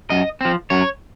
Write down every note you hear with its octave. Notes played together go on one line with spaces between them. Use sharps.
F#2 D#5
F3 C4
F#2 C#5